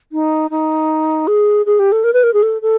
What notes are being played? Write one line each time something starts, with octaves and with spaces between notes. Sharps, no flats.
D#4
D#4
G#4
G#4
G4
A4
A#4
B4
A#4
G#4
A4
A4